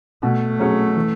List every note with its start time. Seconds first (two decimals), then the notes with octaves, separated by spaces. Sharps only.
0.23 B2 A3
0.59 F#3 C#4 G#4 C#5
0.96 E3